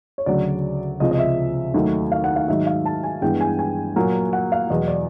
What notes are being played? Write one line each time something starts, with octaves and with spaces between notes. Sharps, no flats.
C#5
D2 C#3 F#3 D5
C#2 C3 F3 D#5
D#5
E5
D#2 D#3 F#3 A3
F5
F#5
F5
G#2 D#3 F#3 E5
F5
A5
G#5
G2 E3 G#3 B3 G5
G#5
G#5
A#2 F#3 A#3
F#5
F5
E2 B2 F#3 D#5
D5